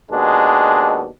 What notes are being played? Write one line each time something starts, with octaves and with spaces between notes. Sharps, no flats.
D#2 B2 G#3 D4